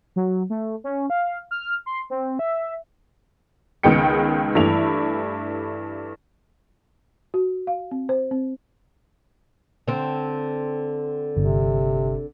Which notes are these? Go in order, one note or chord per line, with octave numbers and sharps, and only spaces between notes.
F#3
A3
C#4
F5
F6
C6
C4
E5
C#2 D#3 G#3 B3 G5 C#7
G2 E3 A3 E4 F7
F#4
F5
C4
C5
C4
D3 C4
G1 C3